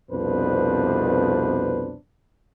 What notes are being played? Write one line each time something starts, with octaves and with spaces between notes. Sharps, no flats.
C2 F2 B2 D4 B4 C5